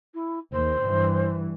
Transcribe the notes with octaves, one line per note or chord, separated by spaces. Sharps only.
E4
D#2 C5
G2 E3